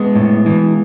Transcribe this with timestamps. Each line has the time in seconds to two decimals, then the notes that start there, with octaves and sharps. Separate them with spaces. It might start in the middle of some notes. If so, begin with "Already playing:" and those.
Already playing: G#3 B3
0.15 A2
0.46 E3